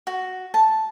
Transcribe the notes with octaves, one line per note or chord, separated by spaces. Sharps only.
F#4
A5